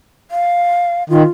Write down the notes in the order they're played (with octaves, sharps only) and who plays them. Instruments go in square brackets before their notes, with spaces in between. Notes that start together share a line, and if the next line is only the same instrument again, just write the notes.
[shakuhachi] F5
[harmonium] D#3 [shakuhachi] F4